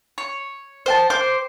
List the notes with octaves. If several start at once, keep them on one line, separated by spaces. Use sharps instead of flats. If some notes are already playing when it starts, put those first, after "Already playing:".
C#5
C5 G5 A5
C5 D6